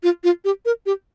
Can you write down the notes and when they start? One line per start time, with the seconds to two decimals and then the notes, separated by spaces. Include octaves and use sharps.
0.03 F4
0.24 F4
0.45 G4
0.65 A#4
0.86 G4